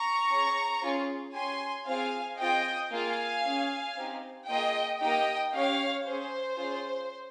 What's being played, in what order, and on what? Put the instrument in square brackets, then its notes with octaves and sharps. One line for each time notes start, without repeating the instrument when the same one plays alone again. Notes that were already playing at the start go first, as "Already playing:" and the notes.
Already playing: [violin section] A#5 C#6
C#4 G#4
C#4 F4 G#4
C#4 G4 G#5 C6
C4 F4 G#4 F5 G#5
C4 F4 G#4 D#5 G5
A#3 F4 G#4 F5 G#5
C#4 G#4
C4 D#4 G4
A#3 F4 G#4 D#5 G5
A#3 D#4 G4 D#5 G5
C#4 G4 C#5 F5
C#4 G#4 C5
C#4 F4 G#4